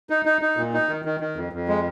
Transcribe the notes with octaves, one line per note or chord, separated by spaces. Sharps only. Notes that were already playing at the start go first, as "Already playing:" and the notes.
D#4
D#4
D#4
A#2
D#4
D#3
D#3
D#3
F2
F2
G#3